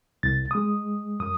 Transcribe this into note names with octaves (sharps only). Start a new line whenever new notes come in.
C2 A6
G#3 D#6
F#2 D#6